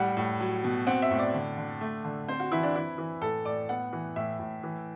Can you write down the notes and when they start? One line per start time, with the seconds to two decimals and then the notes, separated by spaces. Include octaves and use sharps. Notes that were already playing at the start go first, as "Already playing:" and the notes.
Already playing: A2 G3 F#5
0.17 A2
0.40 F#3
0.64 B2
0.87 C4 F#5
1.02 E5
1.11 A2
1.19 D5
1.34 D3
1.57 D3
1.81 A3
2.04 D3
2.28 C4 C5
2.40 F#4
2.52 E3 E4
2.63 D4
2.75 E3 E4
2.98 E3
3.22 A2 A4
3.45 A2 D5
3.69 B3 F#5
3.93 E3
4.16 A2 E5
4.39 A2
4.63 E3